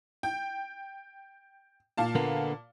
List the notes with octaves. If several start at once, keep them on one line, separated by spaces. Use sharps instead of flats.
G5
A#2 F5 A5
D3 A#3 B3